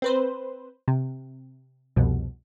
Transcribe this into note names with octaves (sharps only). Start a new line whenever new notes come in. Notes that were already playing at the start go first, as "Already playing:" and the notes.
C4 B4 C5
C3
C2 F2 B2